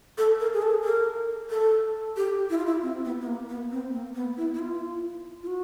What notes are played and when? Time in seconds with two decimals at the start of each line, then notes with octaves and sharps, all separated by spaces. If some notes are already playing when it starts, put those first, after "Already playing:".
0.18 A4
0.40 A#4
0.54 G#4
0.62 A4
0.84 A#4
1.50 A4
2.17 G4
2.50 E4
2.58 F4
2.66 E4
2.82 C4
3.05 B3
3.21 B3
3.27 A#3
3.49 B3
3.71 C4
3.93 A#3
4.15 B3
4.37 E4
4.54 E4
4.59 F4
5.43 F4
5.47 F#4